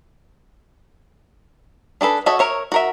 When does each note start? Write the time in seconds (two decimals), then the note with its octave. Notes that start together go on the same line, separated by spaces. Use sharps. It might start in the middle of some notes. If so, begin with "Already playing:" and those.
2.01 D4 G#4 A4 B4
2.26 F#4 A4 C#5 D#5 E5
2.39 A#4 C#5 E5
2.72 F#4 A#4 E5